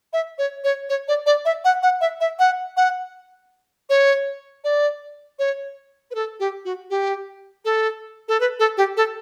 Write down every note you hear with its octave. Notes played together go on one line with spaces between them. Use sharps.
E5
C#5
C#5
C#5
D5
D5
E5
F#5
F#5
E5
E5
F#5
F#5
C#5
D5
C#5
B4
A4
G4
F#4
G4
A4
A4
B4
A4
G4
A4